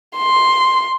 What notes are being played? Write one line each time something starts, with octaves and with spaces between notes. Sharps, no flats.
C6